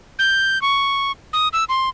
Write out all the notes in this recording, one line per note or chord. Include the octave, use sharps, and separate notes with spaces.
G6
C#6
D#6
E6
C6